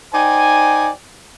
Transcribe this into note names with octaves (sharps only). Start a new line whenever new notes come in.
D#4 C5 D5 G5 G#5